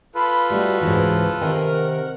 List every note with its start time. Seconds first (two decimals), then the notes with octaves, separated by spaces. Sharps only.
0.15 F4 A4 B4 B5
0.50 G3 A3 D#4 F#4
0.81 C#2 G#2 E3
1.41 C3 D#3 A#4 G#5
1.73 F#5